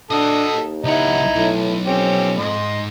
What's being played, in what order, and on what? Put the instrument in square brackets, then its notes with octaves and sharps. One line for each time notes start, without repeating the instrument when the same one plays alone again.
[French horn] D4 [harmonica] A4 D#6 [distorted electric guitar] D#5 F#5
[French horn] D#2
[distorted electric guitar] C#2 F#5 [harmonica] D#4 E4
[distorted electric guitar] B1 [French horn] A2
[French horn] F2 [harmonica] C4 C#4 G4
[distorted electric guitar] G#2 [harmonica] D#5 C6